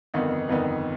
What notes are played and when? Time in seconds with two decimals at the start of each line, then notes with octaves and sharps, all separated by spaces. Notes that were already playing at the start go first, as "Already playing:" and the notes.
0.14 G1 F2 D#3 B3 D#4
0.49 G1 F2 D#3 B3 D#4